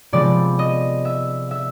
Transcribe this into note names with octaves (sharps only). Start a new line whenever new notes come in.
C3 F3 G#3 B3 D5
D#5
E5
E5